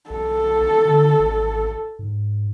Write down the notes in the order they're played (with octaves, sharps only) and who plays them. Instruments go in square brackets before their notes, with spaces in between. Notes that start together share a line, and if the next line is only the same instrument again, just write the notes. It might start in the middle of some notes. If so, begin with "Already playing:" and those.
[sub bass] B1 [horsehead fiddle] A4
[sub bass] D3
G#1
G#2